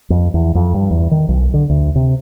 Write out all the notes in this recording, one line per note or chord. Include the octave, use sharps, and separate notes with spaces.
F2
E2
F2
G2
E2
D#3
B1
D3
D2
C3